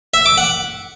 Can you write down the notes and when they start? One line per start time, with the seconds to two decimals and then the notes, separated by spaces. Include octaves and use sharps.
0.14 E5
0.26 D6
0.38 F#5